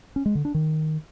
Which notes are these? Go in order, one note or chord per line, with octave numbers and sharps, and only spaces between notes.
C#4
G#3
D3
D4
D#3